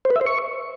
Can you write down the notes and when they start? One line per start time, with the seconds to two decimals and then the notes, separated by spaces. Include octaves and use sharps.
0.05 C5
0.10 B4
0.16 E5
0.21 C5
0.26 C#6